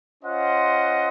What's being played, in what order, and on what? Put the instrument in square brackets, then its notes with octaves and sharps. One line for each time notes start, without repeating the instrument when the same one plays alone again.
[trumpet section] C#4 F4 C5 D#5 F#5